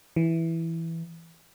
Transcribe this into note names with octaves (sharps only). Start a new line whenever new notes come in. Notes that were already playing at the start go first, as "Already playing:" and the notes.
E3